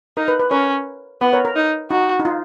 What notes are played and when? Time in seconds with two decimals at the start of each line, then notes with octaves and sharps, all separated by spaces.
0.17 D#4 A#4
0.28 B4
0.40 B4
0.51 C#4 A#4 C#5
1.21 B3 B4
1.33 A#4 C#5
1.45 A#4
1.56 D#4
1.91 D#4 F#4
2.20 D#4
2.25 F4